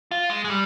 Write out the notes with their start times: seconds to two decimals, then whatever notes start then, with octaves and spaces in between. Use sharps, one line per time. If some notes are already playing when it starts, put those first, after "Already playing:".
0.11 F4
0.30 G#3
0.44 G#3
0.49 G3